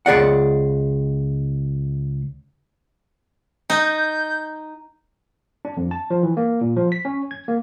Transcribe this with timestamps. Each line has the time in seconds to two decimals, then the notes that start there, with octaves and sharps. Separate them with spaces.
0.06 C#2 G#4 D5 F#5
3.70 D#4 G6
5.65 D4
5.77 F2
5.91 A5
6.10 F3
6.23 E3
6.37 A#3
6.61 A#2
6.76 F3
6.92 B6
7.05 C#4
7.31 G#6
7.48 A#3